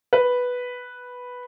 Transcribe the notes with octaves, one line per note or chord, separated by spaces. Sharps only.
B4